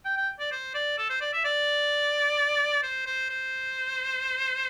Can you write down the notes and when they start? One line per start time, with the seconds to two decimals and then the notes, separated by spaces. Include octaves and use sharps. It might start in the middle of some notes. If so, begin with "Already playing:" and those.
0.05 G5
0.17 G5
0.40 D5
0.52 C5
0.74 D5
0.98 A4
1.10 C5
1.21 D5
1.33 E5
1.44 D5
2.83 C5
3.06 C5
3.30 C5